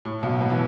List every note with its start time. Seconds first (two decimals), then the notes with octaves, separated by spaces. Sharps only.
0.05 A2
0.23 B1 B2
0.41 B2 B3
0.50 E3